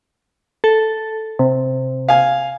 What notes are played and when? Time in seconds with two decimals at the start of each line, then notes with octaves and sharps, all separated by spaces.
0.64 A4
1.39 C3
2.09 F5 G#5